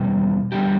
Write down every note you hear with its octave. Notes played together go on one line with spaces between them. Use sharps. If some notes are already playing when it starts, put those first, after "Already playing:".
Already playing: E2 B2 G3
E2 D3 G3 G4